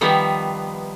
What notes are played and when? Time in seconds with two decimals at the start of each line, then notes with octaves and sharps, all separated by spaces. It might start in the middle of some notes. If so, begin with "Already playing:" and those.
0.01 D#3 F3 G3 B3